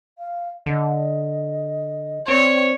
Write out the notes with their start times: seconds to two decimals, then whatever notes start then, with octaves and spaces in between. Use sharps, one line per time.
0.18 F5
0.66 D3 D#5
2.28 C4 C#5 D5